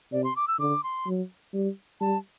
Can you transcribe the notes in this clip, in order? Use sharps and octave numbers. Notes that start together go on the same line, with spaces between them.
C3 D5
C6
D6
E6
D3 D6
C6
F#3
G3
G3 A5